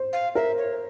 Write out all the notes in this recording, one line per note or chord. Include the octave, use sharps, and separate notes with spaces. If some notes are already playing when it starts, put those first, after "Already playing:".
Already playing: C5
F5
A#4 E5
C#5